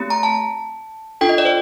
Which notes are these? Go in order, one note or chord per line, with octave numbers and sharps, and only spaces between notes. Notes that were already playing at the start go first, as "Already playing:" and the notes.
Already playing: A3 C4 G4
A#5
A5
D4 F4 A4 G5
D#5
D5
C5